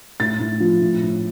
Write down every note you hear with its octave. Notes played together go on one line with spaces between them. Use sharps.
A2 A6
A2
F3
A2
A2